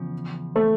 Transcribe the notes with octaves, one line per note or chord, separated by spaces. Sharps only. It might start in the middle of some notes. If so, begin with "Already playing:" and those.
Already playing: E2 C#3 F3
A3